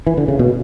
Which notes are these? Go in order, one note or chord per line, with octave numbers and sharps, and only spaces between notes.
E3
D3
C#3
B2